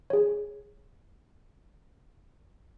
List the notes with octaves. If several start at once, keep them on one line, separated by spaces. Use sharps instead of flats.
G#4 C#5